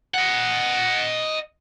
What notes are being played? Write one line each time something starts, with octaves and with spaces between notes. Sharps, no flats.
D#5 F#5